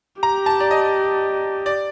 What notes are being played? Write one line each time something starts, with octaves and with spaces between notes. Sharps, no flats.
G4 A#5
A5
D5
D#5
D5